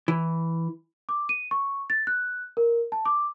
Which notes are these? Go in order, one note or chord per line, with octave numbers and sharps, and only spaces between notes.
E3
D6
D#7
C#6
A6
F#6
A#4
A5
D6